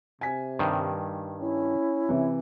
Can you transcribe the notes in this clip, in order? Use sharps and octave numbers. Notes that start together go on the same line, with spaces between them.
C3 G#5 B6
G2 D#3
C#4 E4
C3 E3